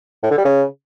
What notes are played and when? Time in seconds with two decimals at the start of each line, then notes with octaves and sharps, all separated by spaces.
0.23 A2
0.31 D3
0.38 G3
0.45 C#3